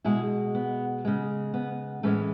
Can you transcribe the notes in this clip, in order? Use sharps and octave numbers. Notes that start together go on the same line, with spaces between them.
B2 G#3 E4 G#4
B3
C#3 G#3
B3
A2 E3 G#3 A3 C#4